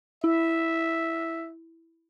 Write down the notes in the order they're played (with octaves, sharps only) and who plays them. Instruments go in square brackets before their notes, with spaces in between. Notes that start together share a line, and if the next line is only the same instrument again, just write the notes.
[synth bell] E4 [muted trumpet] E5